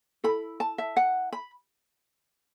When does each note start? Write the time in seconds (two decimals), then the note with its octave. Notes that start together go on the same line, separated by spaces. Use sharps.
0.24 E4 A4 B5
0.60 A5
0.78 E5
0.97 F#5
1.32 B5